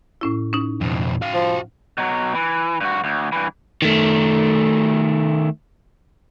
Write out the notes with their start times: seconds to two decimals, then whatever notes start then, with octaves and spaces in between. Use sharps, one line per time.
0.21 A2 C#4 E4
0.53 C#4 D#4
0.81 F2 B2
1.22 F#4 F5
1.34 F3
1.98 B2 F#3
2.35 E3
2.81 G2 F#4
3.04 D2
3.32 G2 E3
3.82 D#3 A3